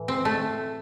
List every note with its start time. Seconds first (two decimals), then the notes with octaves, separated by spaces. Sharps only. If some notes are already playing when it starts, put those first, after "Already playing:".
Already playing: A2 E3
0.08 C4
0.25 A3